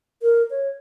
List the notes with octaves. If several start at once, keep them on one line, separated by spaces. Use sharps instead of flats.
A#4
C#5